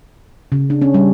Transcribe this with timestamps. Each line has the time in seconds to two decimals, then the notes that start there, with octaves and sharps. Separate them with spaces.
0.52 C#3
0.70 D4
0.82 C#4
0.94 G3